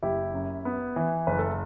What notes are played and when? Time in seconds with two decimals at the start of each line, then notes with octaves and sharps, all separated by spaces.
0.02 F#1 E4 G4
0.34 F#2
0.65 B3
0.96 E3
1.27 F#1 B4
1.39 A4